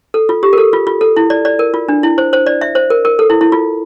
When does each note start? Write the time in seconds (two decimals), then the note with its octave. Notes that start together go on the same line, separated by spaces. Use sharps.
0.14 A4
0.29 F4
0.43 G4
0.53 A#4
0.58 A4
0.73 F4
0.87 F4
1.01 A4
1.17 E4
1.30 D5
1.45 D5
1.59 A#4
1.74 F4
1.88 D4
2.03 E4
2.18 C5
2.33 C5
2.46 D5
2.61 E5
2.75 C5
2.90 A#4
3.05 A#4
3.19 A4
3.30 E4
3.41 E4
3.52 F4